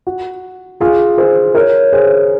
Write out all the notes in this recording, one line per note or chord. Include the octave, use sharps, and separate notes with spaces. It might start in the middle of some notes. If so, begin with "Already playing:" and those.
F#4
F4 G#4
G#4 C5
A#4 C#5
G#4 C5